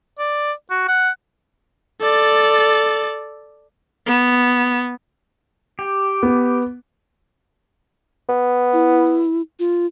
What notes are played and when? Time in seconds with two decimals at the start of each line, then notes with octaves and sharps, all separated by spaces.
0.18 D5
0.70 F#4
0.88 F#5
2.01 A4 D5
4.06 B3
5.79 G4
6.23 B3
8.29 B3
8.73 E4
9.59 F4